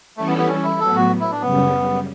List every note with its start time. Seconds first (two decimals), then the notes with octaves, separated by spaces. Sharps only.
0.16 E3 G3 A3 C#4 E4 A4
0.27 B3
0.38 B3
0.48 C#4
0.63 E4
0.79 A2 F#3 B3 A4
0.95 F#4
1.20 E4
1.32 D4
1.42 F#2 C#3 G3 B3